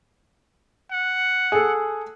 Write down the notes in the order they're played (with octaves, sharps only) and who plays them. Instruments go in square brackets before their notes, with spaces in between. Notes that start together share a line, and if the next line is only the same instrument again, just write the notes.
[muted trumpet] F#5
[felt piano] G#4 A4